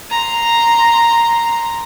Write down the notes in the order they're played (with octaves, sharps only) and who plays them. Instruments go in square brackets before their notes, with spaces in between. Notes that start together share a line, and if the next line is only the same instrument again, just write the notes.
[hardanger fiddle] A#5 C6